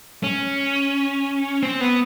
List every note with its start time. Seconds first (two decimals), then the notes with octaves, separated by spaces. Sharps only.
0.24 C#4
1.63 C4
1.81 B3